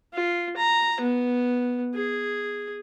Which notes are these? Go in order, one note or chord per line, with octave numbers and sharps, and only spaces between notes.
F4
A#5
B3
G#4